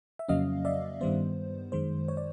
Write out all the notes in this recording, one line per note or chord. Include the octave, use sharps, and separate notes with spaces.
E5
F2 C#3 F#3 A#3 C#4 D#5 F5
D5 E5
G2 D#3 G3 B3 C5
F#2 D#3 G#3 C5
C#5
D5